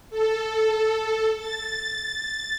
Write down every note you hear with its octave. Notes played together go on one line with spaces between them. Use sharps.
A4
A6